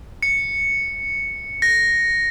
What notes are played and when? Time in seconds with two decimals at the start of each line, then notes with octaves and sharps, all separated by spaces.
0.23 C#7
1.62 A#6